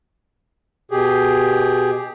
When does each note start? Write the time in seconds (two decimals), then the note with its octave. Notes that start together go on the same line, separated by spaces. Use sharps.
0.91 B2 G4 G#4